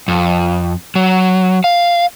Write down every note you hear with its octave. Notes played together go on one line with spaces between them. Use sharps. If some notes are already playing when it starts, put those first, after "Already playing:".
F2
F#3
F5